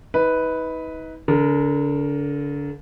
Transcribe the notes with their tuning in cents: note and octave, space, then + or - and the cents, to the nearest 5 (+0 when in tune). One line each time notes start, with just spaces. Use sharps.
D#4 +40 B4 +0
D3 -35 A#4 +0